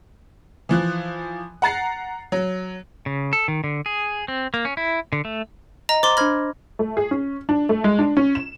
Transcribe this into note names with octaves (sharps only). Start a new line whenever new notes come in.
E3 F3 F#6
F#5 A#5 A6 C7
F#3
C#3
A4
D#3
D3
G#4
C4
A#3
C#4
E4
D3
A3
D#5 A#5
C5 A#5 C6 D6 A6
D4 C5 B5 F6 G#6 A#6
A3
G#4
C#4
D4
A3
G#3
D4
C#4
E7